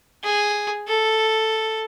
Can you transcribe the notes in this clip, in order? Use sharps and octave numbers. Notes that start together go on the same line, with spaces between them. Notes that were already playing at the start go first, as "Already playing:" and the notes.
G#4
A4